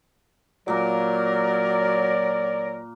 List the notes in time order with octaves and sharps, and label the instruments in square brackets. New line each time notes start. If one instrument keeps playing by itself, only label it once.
[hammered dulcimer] A#2 A#3 [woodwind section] F#3 A#4 [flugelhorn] D5